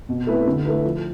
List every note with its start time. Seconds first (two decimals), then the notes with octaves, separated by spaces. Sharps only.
0.09 B2
0.27 A3 C4 E4 B4
0.47 D3
0.65 A3 E4 B4
0.84 F3